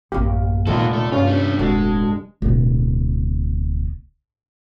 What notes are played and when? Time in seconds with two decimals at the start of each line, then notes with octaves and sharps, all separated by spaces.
0.12 A1 F#2 A#3 G4
0.67 F1 D#2 A#2 G#3 F4 A4 A5
0.93 A3 D5
1.12 G2 C#4 F4
1.27 G3 A3
1.59 D1 G#3 F#4 A4 A5
2.42 D1 B2